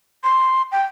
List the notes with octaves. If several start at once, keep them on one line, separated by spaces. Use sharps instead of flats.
C6
G5